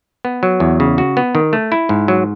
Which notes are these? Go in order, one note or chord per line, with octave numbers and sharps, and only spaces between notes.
B3
F#3
E2
C#3
F#4
B3
D#3
A3
E4
G#2
F#3